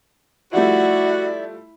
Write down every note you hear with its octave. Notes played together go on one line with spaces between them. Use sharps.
F3 G3 A3 E4 F#4 D5